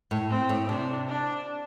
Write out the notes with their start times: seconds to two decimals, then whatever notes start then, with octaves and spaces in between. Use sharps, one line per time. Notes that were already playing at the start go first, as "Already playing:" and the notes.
0.11 A2
0.30 C4
0.49 A2
0.68 C3 D4
1.08 D4